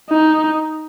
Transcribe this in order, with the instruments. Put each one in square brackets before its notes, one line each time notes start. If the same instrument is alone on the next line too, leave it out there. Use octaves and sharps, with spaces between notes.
[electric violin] D#4